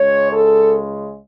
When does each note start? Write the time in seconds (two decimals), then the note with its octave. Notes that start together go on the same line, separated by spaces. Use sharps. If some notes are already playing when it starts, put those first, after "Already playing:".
Already playing: C#2 C#3 G#3 C#5
0.32 A4